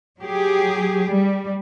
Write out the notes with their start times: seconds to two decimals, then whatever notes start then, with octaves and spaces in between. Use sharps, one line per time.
0.20 F#3 G4 G#4
1.10 G3